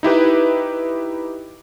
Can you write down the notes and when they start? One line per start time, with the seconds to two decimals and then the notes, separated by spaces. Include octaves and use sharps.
0.03 D#4 E4 G4 B4